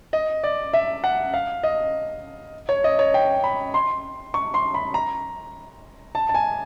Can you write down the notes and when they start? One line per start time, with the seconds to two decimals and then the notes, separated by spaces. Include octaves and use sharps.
0.13 D#5
0.43 D5
0.73 E5
1.04 F#5
1.34 F5
1.63 D#5
2.69 C#5
2.84 D#5
2.99 C#5
3.14 G5
3.44 B5
3.74 C6
4.34 C#6
4.54 C6
4.74 B5
4.94 A#5
6.15 A5
6.29 A5
6.34 G#5